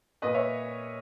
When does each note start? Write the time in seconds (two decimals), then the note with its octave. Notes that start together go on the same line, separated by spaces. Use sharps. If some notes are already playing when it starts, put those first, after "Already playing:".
0.22 A#2 B4 D#5
0.34 C#5 E5